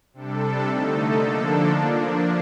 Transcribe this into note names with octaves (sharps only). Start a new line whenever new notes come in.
C3 G3 D4 A4
D3 A3 D#4 A4
D3 F3 A#3 D4 A4
F3 A#3 D4